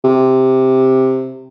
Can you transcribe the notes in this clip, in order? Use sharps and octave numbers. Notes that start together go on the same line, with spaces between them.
C3